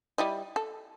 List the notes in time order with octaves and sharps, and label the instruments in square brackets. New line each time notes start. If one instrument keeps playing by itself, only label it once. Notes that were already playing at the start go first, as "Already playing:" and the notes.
[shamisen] G3 E4 D#5
A4